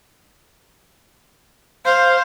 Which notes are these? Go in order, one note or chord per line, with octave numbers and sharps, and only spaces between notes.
C5 F5